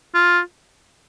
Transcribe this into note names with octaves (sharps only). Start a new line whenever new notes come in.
F4